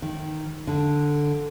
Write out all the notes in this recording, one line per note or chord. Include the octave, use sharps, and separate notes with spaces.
D#3
D3